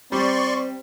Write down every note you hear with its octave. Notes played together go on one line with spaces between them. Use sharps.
G3 C4 D5 C6 C#6